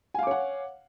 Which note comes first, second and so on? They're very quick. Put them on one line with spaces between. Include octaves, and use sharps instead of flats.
G#5 F5 D6 C#5 F#5